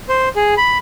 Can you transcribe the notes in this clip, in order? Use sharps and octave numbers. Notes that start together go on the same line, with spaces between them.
C5
G#4
B5